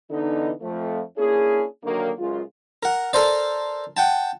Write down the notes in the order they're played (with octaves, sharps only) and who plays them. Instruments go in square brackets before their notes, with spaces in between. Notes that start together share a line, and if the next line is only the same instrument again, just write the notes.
[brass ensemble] D3 E3 B3 D#4
F2 F3 A3
A#3 C#4 D4 E4 G#4
D3 D#3 F#3 A#3
C#2 F#2 C#3 G#3 F4
[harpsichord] A#4 F#5
A4 A#4 C5 D5
F#5 G5 A5